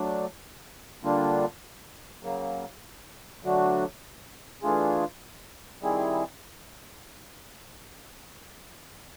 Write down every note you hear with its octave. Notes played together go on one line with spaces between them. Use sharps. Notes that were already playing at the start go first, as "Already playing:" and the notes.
Already playing: F#3 A3 D4
D3 G3 A#3 D4 F4
C#3 F#3 A#3
D3 F#3 A3 D4 F#4
E3 A3 D4 F4 G#4
D#3 G3 C4 E4 G#4